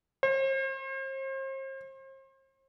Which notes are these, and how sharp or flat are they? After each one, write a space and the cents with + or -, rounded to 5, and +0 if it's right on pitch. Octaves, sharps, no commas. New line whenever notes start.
C5 +40